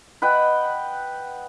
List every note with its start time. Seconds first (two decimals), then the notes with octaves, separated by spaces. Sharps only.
0.22 B4 D#5 F#5 G5